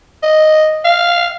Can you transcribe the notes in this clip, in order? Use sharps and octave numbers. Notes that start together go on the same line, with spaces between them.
D#5
F5